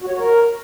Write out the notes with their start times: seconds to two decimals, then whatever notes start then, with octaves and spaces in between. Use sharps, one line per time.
0.02 F#4
0.08 C#5
0.13 F#4
0.19 A#4